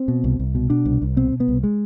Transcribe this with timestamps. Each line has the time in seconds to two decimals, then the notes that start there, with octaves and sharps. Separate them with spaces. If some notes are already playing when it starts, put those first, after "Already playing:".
Already playing: C4
0.08 B2
0.24 C2
0.39 C2
0.55 B2
0.70 B2 D4
0.85 C2
1.02 C2
1.17 B2 C4
1.32 B2
1.40 B3
1.48 C2
1.64 G#3